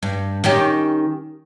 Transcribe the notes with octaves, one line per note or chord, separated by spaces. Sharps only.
G2
D#3 C#4 G4